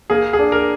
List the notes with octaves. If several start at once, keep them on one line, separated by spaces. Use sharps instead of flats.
A#3 G#4
G#4
D4
A#4